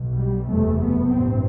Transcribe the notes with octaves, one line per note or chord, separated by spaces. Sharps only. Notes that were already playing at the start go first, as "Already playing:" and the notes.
Already playing: B1 B2
G3
F#1 E2 C3 A3
B3
A1 G2 C4